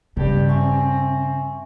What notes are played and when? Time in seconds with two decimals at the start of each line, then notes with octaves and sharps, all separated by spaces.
0.17 G2 C#3 G4
0.49 C4 E5 G#5 C#6